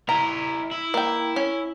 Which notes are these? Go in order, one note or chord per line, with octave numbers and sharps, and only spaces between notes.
E4 A#4 A#5
E4
A#3 G5
C#4